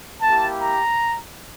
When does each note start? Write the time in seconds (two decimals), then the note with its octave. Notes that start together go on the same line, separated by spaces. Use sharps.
0.22 A#3 E4 G4 A5
0.62 A#5